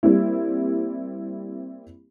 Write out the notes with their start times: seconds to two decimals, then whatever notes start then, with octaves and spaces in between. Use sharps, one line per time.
0.03 G3 A#3 C4 E4